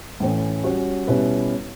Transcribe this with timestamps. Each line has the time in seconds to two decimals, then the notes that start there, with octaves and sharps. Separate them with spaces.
0.20 A2 E3 A3 C#4
0.64 G3 C#4 F#4
1.08 B2 G3 C#4 E4 B4